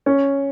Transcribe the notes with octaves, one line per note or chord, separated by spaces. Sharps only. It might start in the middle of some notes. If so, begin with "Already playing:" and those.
C#4